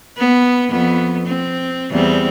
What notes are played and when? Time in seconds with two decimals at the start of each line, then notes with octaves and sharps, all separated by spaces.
0.18 B3
0.70 F2 B3
1.26 C4
1.91 E2 G3 C4